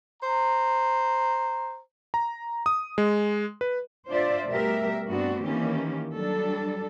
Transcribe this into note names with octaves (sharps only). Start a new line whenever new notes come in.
C5 A#5
A#5
D#6
G#3
B4
D4 F4 C5 D5 E5
B2 G3 A3 G4 A#4 E5
G2 A3 B3 C4 D4 F#4
D#3 E3 A#3 C#4 G4
F#3 G3 D4 A4